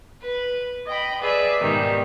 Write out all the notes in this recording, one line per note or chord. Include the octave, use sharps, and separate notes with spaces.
B4
D#5 G5 B5
G#4 B4 D5 E5
G#2 B2 D#3 G3